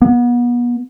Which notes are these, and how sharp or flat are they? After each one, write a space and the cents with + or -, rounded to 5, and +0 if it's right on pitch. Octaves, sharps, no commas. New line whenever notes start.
B3 -35